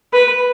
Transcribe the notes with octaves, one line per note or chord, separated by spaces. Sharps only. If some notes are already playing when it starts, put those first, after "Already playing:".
B4